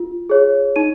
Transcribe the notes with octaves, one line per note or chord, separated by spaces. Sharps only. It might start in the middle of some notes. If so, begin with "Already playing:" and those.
Already playing: F4
G#4 C#5
D#4 D#7